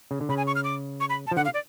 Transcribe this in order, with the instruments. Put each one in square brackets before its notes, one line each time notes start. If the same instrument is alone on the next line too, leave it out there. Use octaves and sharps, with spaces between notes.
[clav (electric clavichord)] C#3
D3
[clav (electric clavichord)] C#3 [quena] B5
[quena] G#5
C#6
F6
D6
C#6
B5
A5
[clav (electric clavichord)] F3
[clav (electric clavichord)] D3 [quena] F#5
[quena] F5
D5